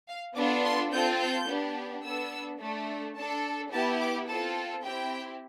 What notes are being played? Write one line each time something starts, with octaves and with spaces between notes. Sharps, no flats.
F5
B3 D4 F4 A4 D6
C6
C4 F4 A4 G6
G6
B3 D4 G4
B3 D4 A4 E6
A3 D4 A4
D4 A4 A5
B3 E4 G4 A5
D6
C4 F4 A4 A5
C4 E4 G4 G5